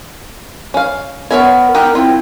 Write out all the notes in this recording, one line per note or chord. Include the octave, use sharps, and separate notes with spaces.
C#4 F5
B3 A#4 C#5 E5 G#5
D#4 G4 A#4 F#5
C4 E4 F4